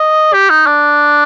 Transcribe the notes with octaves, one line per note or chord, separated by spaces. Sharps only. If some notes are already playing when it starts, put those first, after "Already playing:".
Already playing: D#5
G4
D#4
D4